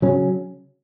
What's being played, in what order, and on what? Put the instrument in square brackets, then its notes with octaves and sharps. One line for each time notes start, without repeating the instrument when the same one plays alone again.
[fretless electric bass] C#3 F#3 C#4